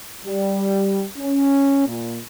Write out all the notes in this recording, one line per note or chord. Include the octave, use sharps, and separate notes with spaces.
G3
C#4
A#2